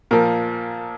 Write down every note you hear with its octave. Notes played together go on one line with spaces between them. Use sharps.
A#2 F3 A#4